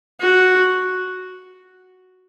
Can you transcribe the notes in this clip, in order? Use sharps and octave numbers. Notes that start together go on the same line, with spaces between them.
F#4